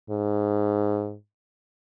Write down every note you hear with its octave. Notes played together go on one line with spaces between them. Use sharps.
G#2